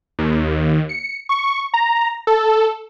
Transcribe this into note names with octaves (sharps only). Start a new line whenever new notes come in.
D#2
C#7
C#6
A#5
A4